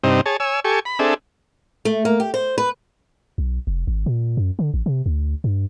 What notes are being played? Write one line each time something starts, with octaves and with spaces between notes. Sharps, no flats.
G2 C3 C4 D#4
G#4 C#5 A5
C#5 G#5 E6
G4 A4 G#5 C#6
B5
C4 D4 G#4 A4 E5
A3
A#3
G4
C5
B4
B1
F1
G#1
A#2
F#2
D3
A1
C3
D2
G2